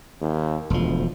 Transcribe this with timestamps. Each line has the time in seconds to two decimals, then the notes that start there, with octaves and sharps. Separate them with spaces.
0.21 D#2
0.70 E1 D2 F3